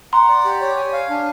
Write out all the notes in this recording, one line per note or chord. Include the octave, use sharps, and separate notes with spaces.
F#5 A#5 C6
D5
G4
C#5
G#5
F5
D4